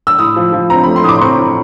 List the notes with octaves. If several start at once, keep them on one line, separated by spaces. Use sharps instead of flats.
E6
A2 D#6
F3
F3
C4 A#5
A3 B5
C6
A2 D6 D#6
C6
C4 C#6
A2